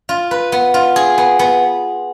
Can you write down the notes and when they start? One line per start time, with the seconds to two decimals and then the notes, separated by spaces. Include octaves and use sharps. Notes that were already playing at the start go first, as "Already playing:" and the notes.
0.09 F4
0.31 B4
0.52 B3
0.74 F4
0.96 G#4
1.18 B3
1.39 B3